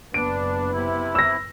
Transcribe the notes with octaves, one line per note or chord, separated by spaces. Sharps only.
F#1 B3 D4 D7
C3 E4
E6 A#6